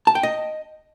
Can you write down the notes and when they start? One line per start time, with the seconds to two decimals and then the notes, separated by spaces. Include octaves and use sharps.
0.07 A5
0.15 G5
0.23 D#5